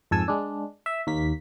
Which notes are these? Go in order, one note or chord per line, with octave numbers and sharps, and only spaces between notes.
F2 G#2 A4 G#5 E6
G#3 D4
E5
D#2 A#3 B6